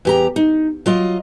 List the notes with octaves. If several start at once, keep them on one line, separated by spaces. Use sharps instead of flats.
E2 G4 A#5
D#4
F#3 F4 D#5